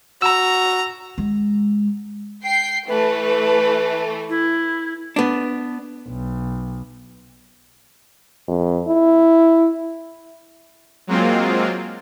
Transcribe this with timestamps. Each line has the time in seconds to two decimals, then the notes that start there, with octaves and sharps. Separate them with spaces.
0.22 F#4 A#5 E6
1.18 G#3
2.44 G5 C7
2.88 E3 A3 B4
4.29 E4
5.16 B3 D4
6.07 B1
8.47 F2
8.87 E4
11.07 F#3 G#3 A#3 C4 F4